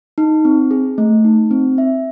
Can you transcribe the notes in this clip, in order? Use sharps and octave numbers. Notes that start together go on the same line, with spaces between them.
D#4
C4
G#4
A3
D#4
C4
E5